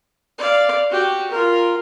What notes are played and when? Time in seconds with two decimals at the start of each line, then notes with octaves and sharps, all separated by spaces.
0.38 D5 F5
0.90 F#4 G4
1.31 F4 A#4